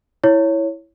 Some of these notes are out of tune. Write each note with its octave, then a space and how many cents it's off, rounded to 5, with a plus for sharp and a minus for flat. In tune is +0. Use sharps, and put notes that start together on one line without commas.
E4 +0 C#5 +0